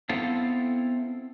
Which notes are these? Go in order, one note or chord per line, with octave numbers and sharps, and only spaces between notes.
B3 C4 E4 A4 F5